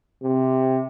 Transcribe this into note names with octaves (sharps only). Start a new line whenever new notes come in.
C3